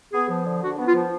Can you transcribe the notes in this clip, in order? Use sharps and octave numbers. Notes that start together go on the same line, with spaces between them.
B3 G#4
F3
D3
D4 F#4
B3
F4
F3